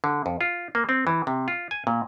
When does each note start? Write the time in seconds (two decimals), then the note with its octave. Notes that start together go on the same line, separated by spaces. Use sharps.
0.04 D3
0.26 F2
0.41 F4
0.75 A#3
0.89 C4
1.07 E3
1.27 C3
1.48 F4
1.71 G#5
1.87 A#2